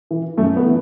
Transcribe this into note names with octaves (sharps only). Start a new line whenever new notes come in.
E3
F#2 A3
B3
E3